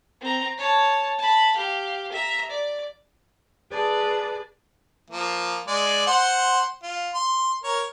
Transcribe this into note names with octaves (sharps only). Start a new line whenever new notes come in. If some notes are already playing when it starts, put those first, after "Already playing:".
C4 A#5
C#5 A5
A5 B5
G4 F5
E5 A#5
D5
G#4 B4 D5 A5
F3 A#3
G#3 D5
C5 F#5 C6
F4
C6
A#4 C#5